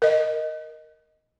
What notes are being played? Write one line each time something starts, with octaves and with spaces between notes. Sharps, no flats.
A#4 D#5